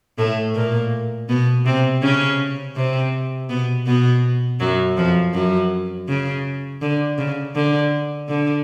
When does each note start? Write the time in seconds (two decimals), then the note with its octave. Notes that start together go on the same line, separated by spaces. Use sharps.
0.18 A2 A3
0.55 A#2 A#3
1.29 B2 B3
1.65 C3 C4
2.02 C#3 C#4
2.76 C3 C4
3.49 B2 B3
3.86 B2 B3
4.60 F#2 F#3
4.97 F2 F3
5.34 F#2 F#3
6.08 C#3
6.81 D3
7.18 C#3
7.55 D3
8.29 D3